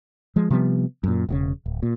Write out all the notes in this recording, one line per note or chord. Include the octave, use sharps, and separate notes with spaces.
F3 G#3
C3 F3 G3 B3
F#2 A#2
E1 A2 C#3
D1
A#2